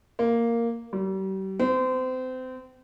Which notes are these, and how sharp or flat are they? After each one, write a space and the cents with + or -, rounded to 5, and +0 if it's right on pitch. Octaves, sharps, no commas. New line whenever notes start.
A#3 -5
G3 -40
C4 -30